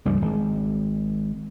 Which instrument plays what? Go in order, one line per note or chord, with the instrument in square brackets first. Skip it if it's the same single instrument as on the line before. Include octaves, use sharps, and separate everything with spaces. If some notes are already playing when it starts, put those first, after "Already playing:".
[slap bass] C#2 G2 F3 G3
G#1